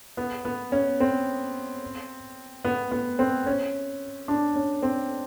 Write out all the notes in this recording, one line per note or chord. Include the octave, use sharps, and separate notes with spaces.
B3
B3
C#4
C4
B3
B3
C4
C#4
D4
C#4
C4